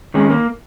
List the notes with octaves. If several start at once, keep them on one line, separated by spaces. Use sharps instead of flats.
D#3 G#3 C#4
A#3